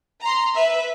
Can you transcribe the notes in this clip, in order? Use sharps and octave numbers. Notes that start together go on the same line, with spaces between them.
A#5 C6
B4 E5